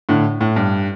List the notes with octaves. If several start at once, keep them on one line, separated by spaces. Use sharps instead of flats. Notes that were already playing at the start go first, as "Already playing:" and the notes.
A2 D3
A2
G2